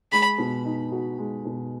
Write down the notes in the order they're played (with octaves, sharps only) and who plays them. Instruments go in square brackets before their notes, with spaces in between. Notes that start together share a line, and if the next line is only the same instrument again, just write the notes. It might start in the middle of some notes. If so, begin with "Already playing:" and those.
[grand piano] G#3 [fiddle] B5
[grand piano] B2
D#4
F#4
G#3
B2